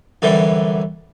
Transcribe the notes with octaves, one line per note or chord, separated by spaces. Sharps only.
F#2 D3 E3 G3